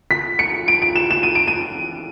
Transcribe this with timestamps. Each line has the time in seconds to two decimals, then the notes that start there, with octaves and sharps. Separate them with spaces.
0.11 B6
0.39 C#7
0.68 D7
0.82 D7
0.96 E7
1.11 E7
1.23 D#7
1.35 D7
1.47 D#7